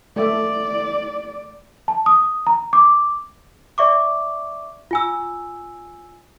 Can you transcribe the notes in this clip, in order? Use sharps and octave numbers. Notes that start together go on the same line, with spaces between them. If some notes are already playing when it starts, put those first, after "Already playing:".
A3 D5 E5
A5
D#6
A#5
D6
D5 E5 C#6 D6
F4 G#5 E6